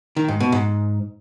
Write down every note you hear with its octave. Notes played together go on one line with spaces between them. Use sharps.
D#3
G#2
B2
G#2